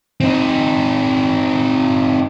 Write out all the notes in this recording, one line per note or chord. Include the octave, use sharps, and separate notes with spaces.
C4 D#4